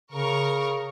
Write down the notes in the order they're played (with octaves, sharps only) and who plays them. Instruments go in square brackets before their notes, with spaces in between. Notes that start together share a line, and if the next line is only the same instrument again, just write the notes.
[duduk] C#3 [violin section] A#4 C#6